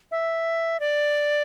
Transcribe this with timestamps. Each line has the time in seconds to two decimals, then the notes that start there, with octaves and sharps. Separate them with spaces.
0.11 E5
0.80 D5